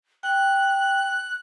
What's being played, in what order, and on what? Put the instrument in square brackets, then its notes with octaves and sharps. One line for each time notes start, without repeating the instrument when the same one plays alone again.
[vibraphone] G5 [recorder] F#6